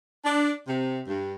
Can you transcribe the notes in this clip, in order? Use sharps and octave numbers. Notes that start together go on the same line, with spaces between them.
D4
C3
G2